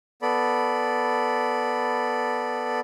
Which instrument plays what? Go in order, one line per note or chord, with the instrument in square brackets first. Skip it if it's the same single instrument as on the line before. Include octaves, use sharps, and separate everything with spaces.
[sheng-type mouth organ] B3 A4 D5 B5